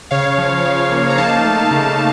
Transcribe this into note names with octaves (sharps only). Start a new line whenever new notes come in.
C#3 C#5 F5
F3
C#3
A#3
A#5
D#4 F5 A5
A3
C#3